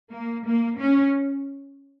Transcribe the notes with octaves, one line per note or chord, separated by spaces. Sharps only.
A#3
A#3
C#4